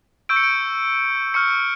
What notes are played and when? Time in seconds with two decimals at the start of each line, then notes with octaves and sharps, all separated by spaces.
0.29 C#6 E6 G6 D7
0.36 C#7
0.43 D7
1.34 C#6 F6 C#7